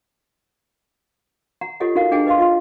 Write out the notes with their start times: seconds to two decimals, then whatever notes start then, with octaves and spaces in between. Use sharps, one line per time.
1.61 F#5 A#5
1.80 F4 G4 A4 C#5 D#5 F#5
1.95 D#4 F#4 A#4 F5 F#5
2.11 D4 G#4 D#5 F#5 G5 A5
2.26 B4 D#5 F5 C6
2.38 F4 D#5 F5 C6